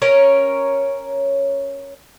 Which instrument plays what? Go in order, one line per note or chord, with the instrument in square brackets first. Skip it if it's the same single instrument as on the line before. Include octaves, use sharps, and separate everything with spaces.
[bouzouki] C#4 A#4 C#5